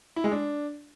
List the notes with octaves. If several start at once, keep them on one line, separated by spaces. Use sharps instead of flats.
E4
G#3
D4